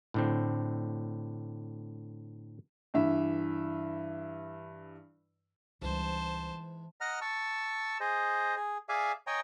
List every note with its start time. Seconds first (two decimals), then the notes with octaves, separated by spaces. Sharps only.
0.14 A2 D3 C4
2.94 G2 E3 E5
5.82 C#2 G#2 E3 G3 C5 A5
7.01 D#5 F#5 A#5 F6
7.21 A5 C#6 E6
8.00 G#4 C5 D#5
8.56 G#4
8.89 G#4 D5 E5 F5 G#5
9.27 C#5 D#5 G5 G#5 A#5